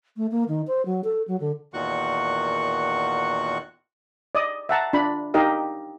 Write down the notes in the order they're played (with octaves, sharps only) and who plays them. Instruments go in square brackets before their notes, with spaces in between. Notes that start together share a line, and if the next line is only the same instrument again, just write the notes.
[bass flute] A3
A#3
D#3
C5
F#3
A4
F#3
D3
[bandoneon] E2 A#2 D#3 F#4 F#5 C#6
[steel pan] D5 D#5 D#6
E5 F#5 A5 A#5
D4 F4 B5
D#4 G4 A#4 D#5 F5